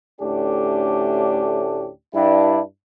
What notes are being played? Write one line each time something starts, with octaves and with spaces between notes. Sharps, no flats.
D2 A2 A3 C#4 D4 G4
G2 D4 E4